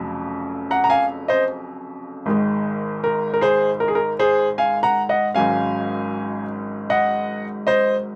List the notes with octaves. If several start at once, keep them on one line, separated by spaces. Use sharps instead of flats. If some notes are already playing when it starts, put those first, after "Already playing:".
Already playing: F1 F2 C#3 F#3 C#4
F#5 A#5
A#5
F5 G#5
C5 D#5
G#1 G#2 D#3 G#3
A#4
A#4
G#4 C5
A#4
G#4
A#4
G#4 C5
F5 G#5
F#5 A#5
D#5 F#5
G#1 G#2 F#3 C#4 F5 G#5
D#5 F#5
C5 D#5